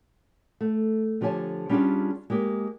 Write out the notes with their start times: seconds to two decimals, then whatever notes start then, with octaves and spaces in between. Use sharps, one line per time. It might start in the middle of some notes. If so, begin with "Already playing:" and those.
0.61 A3
1.21 D3 F3 G4 C#5 G#5 A5
1.69 G3 C#4 D4 F4 G4 G#4
2.30 G#3 A#3 G4